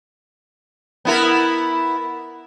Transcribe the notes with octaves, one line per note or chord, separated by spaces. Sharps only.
B3 E4 A#4